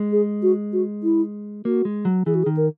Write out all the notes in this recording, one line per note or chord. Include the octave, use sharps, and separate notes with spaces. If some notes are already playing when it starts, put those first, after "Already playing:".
Already playing: G#3
G#4
F#4
F#4
E4
A#3 F#4
G#3
F#3
E3 G#4
F#4
G#4
D#3
A#4